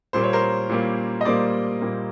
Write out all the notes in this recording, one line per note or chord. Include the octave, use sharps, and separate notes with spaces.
A#2 G3 A#3 C5
C#5
A#4 C5
A#2 G3 A#3
D#5
A#2 G3 A#3 C5 D5
A#2 G3 A#3